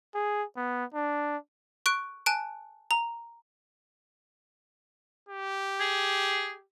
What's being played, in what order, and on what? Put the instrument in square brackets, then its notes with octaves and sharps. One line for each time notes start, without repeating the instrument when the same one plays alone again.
[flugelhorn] G#4
B3
D4
[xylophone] C#6 F#6 D7
G#5 A5 F#6 D7
A#5
[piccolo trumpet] G4
[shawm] G#4